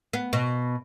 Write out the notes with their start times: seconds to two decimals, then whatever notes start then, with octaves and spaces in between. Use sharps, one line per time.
0.13 B3
0.33 B2